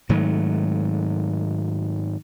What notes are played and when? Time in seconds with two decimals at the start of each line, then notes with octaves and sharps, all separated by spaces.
0.09 G#2 D#3 F#3 A3